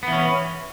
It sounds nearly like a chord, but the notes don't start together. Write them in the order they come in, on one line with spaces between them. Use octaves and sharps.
B3 E3 C#4